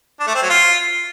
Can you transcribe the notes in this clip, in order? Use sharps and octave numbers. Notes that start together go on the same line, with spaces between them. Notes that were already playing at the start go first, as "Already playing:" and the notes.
D4
A3
C4
F#3
F4